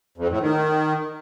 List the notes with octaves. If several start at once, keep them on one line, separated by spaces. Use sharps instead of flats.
F2
A2
D#3